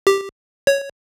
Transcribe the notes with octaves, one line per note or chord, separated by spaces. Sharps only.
G4
C#5